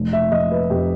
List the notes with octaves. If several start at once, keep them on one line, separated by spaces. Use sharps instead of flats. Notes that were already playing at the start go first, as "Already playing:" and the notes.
Already playing: F1
E5
F1 D#5
B4
F2 G4